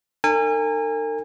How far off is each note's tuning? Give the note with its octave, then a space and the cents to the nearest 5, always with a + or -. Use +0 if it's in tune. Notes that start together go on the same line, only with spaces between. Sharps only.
D#4 -45 A#4 -45 G#5 -30